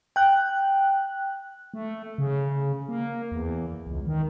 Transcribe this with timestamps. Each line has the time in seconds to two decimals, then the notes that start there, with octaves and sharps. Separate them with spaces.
0.16 G5 F#6
1.74 A3
2.18 C#3
2.89 A#3
3.32 E2
3.87 C#2
4.07 D#3